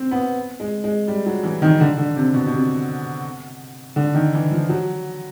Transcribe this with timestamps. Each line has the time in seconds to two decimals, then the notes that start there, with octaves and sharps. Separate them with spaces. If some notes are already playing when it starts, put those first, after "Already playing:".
Already playing: C4
0.11 B3
0.60 G#3
0.84 G#3
1.08 G3
1.26 F#3
1.43 E3
1.62 D#3
1.80 D3
1.98 D3
2.16 C3
2.34 B2
2.47 B2
2.52 C3
3.96 D3
4.15 D#3
4.33 E3
4.51 F3
4.69 F#3